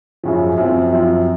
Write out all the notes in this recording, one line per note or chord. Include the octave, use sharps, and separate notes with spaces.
F#2 C#3 F3
F#2 F3 C4
F#2 F3 C4